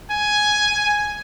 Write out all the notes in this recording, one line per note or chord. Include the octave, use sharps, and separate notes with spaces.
G#5